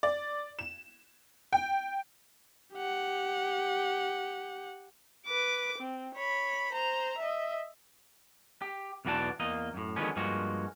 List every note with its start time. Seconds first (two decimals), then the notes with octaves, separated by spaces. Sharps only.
0.03 D5
0.59 E7
1.53 G5
2.74 G4 F#5
5.26 B4 D6
5.78 C4
6.15 C#5 B5
6.73 C5 A#5
7.18 D#5 E5
8.62 G4
9.05 B1 E2 E3 F#4 D5 A5
9.40 E2 A#3 D#5
9.74 F#2 A2
9.96 D3 D#3 F3 G#3 B3 C#4
10.16 G2 F3 G#3 A#3 F#4